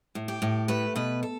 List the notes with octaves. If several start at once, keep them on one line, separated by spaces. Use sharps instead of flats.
A2
G4
A2
A3 B4
B2 B4
A4